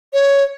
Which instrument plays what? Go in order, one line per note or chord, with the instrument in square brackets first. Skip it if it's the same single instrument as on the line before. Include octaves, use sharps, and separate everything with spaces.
[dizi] C#5